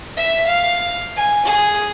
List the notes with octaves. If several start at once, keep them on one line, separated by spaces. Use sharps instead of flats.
E5
F5
G#5
G#4